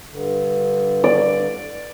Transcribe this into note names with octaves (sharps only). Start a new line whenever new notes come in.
G2 D3
D5